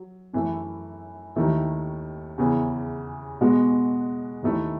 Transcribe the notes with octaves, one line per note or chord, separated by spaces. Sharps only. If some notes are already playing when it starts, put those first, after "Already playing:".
Already playing: F#3
F#2 E3 A3 E4
D#2 D#3 A3 E4
E2 C#3 E3
B2 G#3 B3 F#4
D#2 D#3 A3 E4